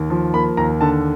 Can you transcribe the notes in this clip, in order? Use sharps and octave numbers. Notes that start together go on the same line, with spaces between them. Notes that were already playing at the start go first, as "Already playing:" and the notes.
Already playing: D#2
F3
A#3 B5
D#2 A#5
D3 A5